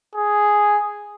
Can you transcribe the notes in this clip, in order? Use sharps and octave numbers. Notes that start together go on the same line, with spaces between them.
G#4